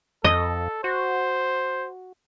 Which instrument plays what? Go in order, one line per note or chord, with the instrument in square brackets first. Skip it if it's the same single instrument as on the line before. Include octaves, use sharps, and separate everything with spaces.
[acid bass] F2 [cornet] A4 [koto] D#5
[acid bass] F#4 [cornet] C5